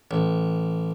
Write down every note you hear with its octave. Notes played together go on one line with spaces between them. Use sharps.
A1